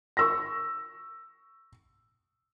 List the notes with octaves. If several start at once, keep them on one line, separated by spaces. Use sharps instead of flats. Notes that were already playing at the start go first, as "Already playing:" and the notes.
C#6 E6 A#6